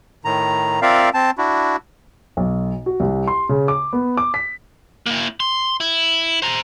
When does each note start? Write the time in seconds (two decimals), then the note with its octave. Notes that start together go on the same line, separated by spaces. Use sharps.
0.25 A2 D#3 A#5
0.82 C4 F4 A#4 D5 E5 F5
1.14 C4 A5
1.38 D4 E4 F#4
2.37 B1
2.86 F#4
3.00 C2
3.28 C6
3.49 C#3
3.68 D6
3.93 B3
4.17 D6
4.34 B6
5.06 A#3 E4
5.40 C6
5.80 E4
6.42 C5 A#5